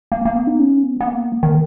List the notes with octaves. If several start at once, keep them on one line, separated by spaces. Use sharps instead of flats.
A#3
A#3
B3
D#4
C#4
B3
B3
A#3
D#3